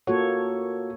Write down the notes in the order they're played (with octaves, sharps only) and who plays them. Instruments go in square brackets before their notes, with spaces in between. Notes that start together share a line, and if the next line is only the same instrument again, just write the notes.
[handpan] A#3 A4 C#5 [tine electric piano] F4 F#4